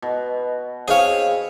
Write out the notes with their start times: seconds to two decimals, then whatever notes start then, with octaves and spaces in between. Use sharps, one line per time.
0.02 B2
0.88 C4 E4 G#4 C#5 F5